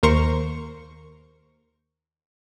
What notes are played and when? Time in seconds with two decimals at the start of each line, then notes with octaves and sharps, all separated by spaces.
0.03 D#2 A#4 C5 C#6